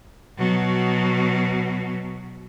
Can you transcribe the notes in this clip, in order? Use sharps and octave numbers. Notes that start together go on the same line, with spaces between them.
B2 F#3